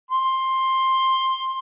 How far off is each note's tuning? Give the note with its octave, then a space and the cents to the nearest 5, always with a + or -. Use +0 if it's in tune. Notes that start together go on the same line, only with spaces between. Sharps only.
C6 +10